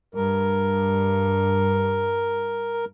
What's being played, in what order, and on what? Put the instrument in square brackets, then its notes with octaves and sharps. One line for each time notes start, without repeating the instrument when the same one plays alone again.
[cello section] G2 [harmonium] A#4